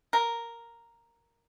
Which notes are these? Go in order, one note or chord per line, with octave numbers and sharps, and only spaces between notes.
A#4